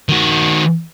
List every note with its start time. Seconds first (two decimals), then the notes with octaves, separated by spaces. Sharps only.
0.09 D#3 F#4